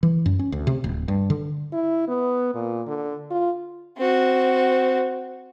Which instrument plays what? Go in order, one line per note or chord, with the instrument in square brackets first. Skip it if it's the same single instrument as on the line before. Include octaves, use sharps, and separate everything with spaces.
[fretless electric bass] E3
F#2
C#4
D2
C3
D1
G2
D3
[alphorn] E4
B3
A#2
D3
F4
[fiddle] C4 F#4